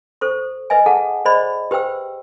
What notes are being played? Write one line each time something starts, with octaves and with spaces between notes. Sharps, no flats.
A4 C5 C#6
B4 D#5 E5 G#5
G#4 A4 F#5 A5
G#4 C5 D5 D#5 B5
G4 B4 C5 G5 E6